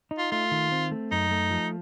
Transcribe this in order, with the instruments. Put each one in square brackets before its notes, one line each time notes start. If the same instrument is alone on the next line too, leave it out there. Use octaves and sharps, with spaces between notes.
[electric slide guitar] D#4
[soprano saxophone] F4
[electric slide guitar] A3 [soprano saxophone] F4
[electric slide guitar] D#3
C4
A3
[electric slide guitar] F#2 [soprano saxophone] D#4
[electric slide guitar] A3
F3